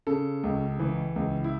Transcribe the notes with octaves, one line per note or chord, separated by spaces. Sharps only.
C#3 A4
C#2
E3
C#2
E4